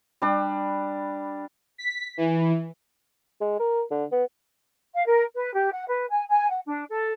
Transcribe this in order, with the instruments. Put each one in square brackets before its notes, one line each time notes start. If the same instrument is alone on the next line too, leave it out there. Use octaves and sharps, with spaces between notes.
[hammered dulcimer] G3 D4
[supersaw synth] B6
E3
[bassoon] G#3
A#4
D3
B3
[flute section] F5
A#4
B4
G4
F#5
B4
G#5
G#5
F#5
D4
A4